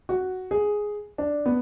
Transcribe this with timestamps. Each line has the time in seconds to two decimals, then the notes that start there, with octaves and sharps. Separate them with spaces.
0.09 F#4
0.51 G#4
1.18 D4
1.46 B3